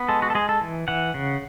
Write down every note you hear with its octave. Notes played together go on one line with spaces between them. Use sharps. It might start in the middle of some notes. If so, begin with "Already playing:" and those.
Already playing: B3
G#3 A4
F#4
A4
G#3 G#4
A4
E3
E3 F#5
C#3